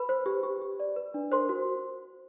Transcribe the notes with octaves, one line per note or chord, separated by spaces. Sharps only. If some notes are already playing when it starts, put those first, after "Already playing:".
Already playing: B4 B5
C5
G4
G4
G4
D5
B4
D4
A#4 C5 C6
F#4